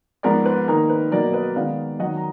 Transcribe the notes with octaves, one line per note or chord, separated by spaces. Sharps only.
G#2 F3 B3 A#4 D5
B4
D#3 A#3 D#4 A#4
B4
B2 F#3 A#3 A#4 D5
B4 D#5
D#3 G#3 B3 D#4 D5 F5
F#2 D#3 F#3 D#5 F#5
A#5